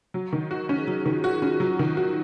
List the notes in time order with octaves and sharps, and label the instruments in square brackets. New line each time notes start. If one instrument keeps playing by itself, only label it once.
[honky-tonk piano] F#3
D#3
F#4
C#4
[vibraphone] G#4
[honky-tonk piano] F#3 [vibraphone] D#4 F#4
[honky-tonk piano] D#3 [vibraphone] F4
[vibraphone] F4 G#4 [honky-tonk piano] F#4
[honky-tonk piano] C#4 [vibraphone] F4 G#4
[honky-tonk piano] F#3 [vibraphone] F4
[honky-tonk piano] D#3
[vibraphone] D#4
[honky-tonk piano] F#4